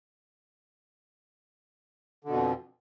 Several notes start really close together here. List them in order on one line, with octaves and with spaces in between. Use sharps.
D3 B2 F2